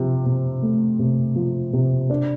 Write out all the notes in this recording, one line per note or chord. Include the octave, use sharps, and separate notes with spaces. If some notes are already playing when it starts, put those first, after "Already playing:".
Already playing: C3 F3
C3
A3
C3
F3
C3
D4